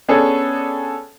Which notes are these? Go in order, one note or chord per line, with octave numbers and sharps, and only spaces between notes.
B3 C#4 D4 G#4 A4